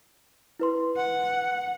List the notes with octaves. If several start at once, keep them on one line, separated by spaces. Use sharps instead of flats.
E4 B4 C6
F#5